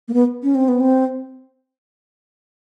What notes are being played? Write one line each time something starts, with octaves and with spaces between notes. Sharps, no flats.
A#3
B3
C#4
C4
B3
C4